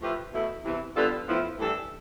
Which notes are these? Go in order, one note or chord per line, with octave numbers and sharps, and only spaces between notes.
F3 A3 E4 G4 B4
E2 B2 A3 E4
E2 C3 E3
D3 G3 B3 F4 A4
A2 F3 B3 E4
A2 E3 G3 D4 A4